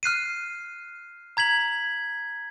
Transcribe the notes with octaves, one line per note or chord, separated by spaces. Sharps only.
F6 F#6 C7 D#7
A#5 G#6 B6 F#7